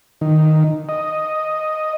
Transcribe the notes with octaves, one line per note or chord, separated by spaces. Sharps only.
D#3
D#5